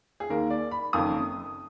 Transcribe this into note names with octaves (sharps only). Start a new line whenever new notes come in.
G#4
D#2 D#3 A#3 A#4
D5
B5
F#1 F2 D#3 A#3 D#6